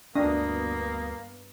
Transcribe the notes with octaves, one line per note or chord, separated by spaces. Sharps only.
D2 G2 A#3 B3 D4 D#6